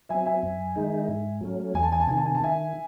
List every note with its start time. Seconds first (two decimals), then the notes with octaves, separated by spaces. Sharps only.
0.09 F#3 C4 E5 G#5
0.26 E5 G#5
0.43 F#2
0.76 D#3 G#3 D#4
1.08 G#2
1.41 F#3 A3 C#4
1.74 E2 G#5
1.83 A5
1.92 G#5
2.00 A5
2.07 C3 D#3 G#5
2.18 A5
2.26 G#5
2.35 A5
2.40 D#3 E5 G#5